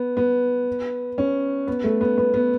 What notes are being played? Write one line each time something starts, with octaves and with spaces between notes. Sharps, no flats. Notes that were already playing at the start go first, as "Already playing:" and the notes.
Already playing: B3
B3
C#4
B3
A3
B3
B3
B3